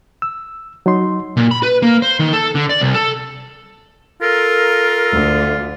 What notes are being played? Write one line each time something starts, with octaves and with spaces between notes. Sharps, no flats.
E6
F#3 D#4 C6
A#2
B5
B4
A#3
C5
D#3
A4
D3
D5
C2
A4
F4 A4 A#4
D2